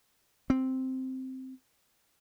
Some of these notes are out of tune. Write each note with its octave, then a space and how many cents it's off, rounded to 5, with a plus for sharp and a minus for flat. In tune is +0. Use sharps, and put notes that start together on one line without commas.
C4 -5